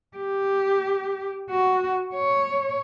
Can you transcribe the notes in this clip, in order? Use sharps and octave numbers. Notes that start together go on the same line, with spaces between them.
G4
F#4
C#5